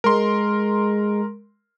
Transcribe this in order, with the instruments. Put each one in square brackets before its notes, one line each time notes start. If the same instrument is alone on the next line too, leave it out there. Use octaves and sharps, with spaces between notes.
[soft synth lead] G#3 [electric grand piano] A#4 C6